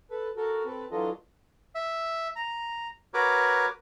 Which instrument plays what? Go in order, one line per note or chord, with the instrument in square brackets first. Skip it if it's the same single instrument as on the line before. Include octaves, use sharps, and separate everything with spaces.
[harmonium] A4 B4
F#4 A4 A#4
C4 A4 B4
E3 F#3 D4 F4 A4 D#5
[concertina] E5
A#5
F#4 A#4 B4 C#5 D6